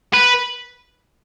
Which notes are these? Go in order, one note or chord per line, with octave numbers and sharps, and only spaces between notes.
B4